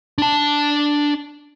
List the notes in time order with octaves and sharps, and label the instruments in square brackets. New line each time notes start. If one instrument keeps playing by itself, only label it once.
[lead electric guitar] D4 A5